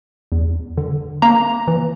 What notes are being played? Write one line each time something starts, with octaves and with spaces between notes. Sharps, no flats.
E2
D3
A#3 A#5
E3